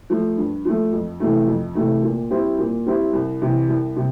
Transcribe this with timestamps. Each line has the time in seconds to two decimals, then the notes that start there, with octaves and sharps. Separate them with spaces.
0.10 F3 A3
0.37 G2
0.65 F3 A3
0.93 F2
1.20 C3 E3 A3
1.47 F2
1.75 C3 E3 A3
2.03 A#2
2.30 G3 C4 E4 G4
2.59 A#2
2.86 G3 C4 E4 G4
3.13 C2
3.42 C3 E3
3.68 C2
3.96 C3